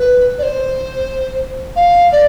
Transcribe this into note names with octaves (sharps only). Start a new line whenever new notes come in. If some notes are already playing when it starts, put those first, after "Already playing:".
Already playing: B4
D5
C5
F5
D5